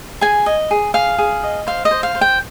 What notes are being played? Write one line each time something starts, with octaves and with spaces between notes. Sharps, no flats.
G#4 G#5
D#5
G#4
G#4 F5
G#4
D#5
C5 F5
D#5
C5
F5
C5
G5